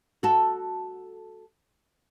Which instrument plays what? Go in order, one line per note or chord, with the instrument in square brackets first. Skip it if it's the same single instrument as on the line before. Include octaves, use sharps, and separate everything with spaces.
[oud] F#4 A4